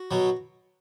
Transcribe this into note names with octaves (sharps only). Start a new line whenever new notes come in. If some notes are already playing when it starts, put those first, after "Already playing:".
Already playing: F#4
B2 F#3